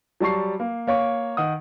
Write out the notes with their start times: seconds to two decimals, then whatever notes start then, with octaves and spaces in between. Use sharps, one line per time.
0.20 F#3 G3 A5 C#6 C7
0.60 A#3
0.87 A#3 C#5 C#6
1.37 D#3 F#5 D#6